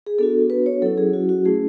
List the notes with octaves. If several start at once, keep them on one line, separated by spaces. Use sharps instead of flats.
G#4
B3 D4 F#4 A4
B4
C#5
F#3 C#4 E4 A4
G#4
F#4
F#4
A3 C#4 E4 G#4